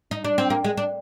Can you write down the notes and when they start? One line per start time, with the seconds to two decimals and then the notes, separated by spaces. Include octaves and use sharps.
0.11 D#4
0.24 D4
0.38 C4
0.50 A#3
0.64 G#3
0.77 D4